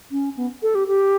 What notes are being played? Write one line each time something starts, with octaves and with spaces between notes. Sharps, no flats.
C#4
B3
A4
G4
G4